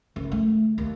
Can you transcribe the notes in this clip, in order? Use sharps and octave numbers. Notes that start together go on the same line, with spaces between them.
F#1
A3
D#2